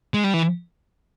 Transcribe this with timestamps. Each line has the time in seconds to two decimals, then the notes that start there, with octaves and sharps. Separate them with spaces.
0.14 G#3
0.24 G3
0.34 E3